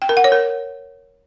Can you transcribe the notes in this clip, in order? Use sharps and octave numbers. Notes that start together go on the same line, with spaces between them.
G5
A#4
F#5
C#5
A#4